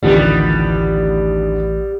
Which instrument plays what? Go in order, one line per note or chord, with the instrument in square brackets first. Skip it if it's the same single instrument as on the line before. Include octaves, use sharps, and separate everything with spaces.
[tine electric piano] A1 [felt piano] D2 D#3 F3 [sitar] G3 B3 G4